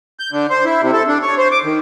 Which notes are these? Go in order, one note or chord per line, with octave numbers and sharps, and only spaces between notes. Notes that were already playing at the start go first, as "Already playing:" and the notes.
G6
D3
C5
E4
C3
A4
D4
C#5
C5
D6
D#3